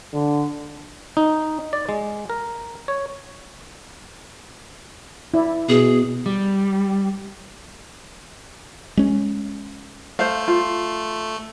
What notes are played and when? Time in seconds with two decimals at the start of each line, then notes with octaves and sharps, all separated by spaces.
0.14 D3
1.17 D#4
1.73 D5
1.89 G#3
2.30 A#4
2.88 C#5
5.34 E4 D5
5.69 B2 G#4
6.26 G3
8.97 G#3 C#4
10.19 A3 C5 F5
10.48 F4